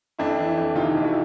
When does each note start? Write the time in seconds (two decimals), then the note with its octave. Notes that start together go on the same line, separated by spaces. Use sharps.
0.18 F2 D4 E4
0.38 E3
0.57 F2
0.75 C3 D#4 F4
0.95 F2
1.04 E4 F#4